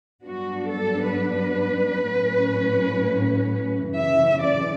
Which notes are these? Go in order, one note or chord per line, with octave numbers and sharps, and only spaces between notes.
G2 F#3 B3 D4 F#4
A4
B4
A2 F#3 C#4
F#2 C#3 E3 E5
D5